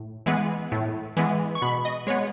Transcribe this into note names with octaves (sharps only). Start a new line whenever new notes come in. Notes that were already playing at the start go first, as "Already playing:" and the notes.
Already playing: A2
E3 G#3 B3
A2
E3 G#3 B3
C#6
B2 B5
D#5
G#3 B3 C#5